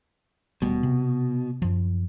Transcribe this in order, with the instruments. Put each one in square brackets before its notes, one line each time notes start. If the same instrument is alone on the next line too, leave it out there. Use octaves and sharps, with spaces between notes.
[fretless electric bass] D#1 G3 A3 [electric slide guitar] B2
[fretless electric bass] C3
F#2 F3